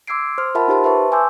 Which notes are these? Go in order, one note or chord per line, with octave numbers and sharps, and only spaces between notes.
C6 D6 E6 G#6 C7 D7
C5 C6 F6
F4 A#4 E5 F#5 A5 B5
D#4 G4 C5 A5 C6
B4 E5 A5 C#6
G#5 C6 D6 E6 G6